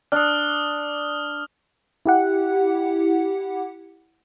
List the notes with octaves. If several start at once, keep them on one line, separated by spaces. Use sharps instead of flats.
D4 D#6 F6
E4 G4 F#5